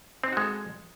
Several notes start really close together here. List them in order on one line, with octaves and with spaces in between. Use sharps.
C4 D#4 F#4 G#3 A4